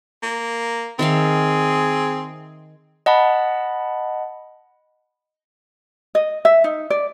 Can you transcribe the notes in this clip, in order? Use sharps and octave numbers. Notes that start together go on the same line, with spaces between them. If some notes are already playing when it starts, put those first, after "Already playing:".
A#3
D#3 C4 G#4 E5 F5
D#5 F#5 A5 B5
D#5
E5
D#4
D5